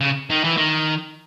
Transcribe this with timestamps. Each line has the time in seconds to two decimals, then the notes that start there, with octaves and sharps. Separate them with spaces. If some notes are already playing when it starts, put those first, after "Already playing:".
0.01 C#3
0.30 D#3
0.44 E3
0.57 D#3